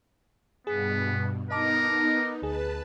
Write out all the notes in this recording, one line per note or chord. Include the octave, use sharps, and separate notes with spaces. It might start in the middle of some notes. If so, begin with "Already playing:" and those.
G2 B2 B3 G#4
B3 D#4 A#4 D#5 A5 D6
D2 G#4 B4 A5